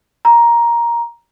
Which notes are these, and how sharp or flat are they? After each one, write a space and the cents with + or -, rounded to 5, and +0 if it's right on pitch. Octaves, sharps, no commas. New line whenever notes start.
A#5 +10